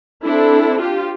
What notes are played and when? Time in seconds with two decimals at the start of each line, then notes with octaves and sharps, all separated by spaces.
0.24 C4 D4 E4 A4
0.80 F4 G4